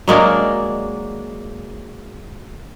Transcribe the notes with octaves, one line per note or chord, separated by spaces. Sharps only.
F#3 G#3 A#3 D4